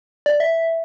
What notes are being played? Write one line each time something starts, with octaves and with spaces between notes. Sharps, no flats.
D5
E5